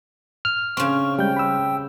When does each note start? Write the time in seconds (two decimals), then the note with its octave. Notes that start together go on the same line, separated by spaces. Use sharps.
0.45 F6
0.77 C#3 C4 C#6
1.19 G3 G#3 G5 G6
1.37 B5 E6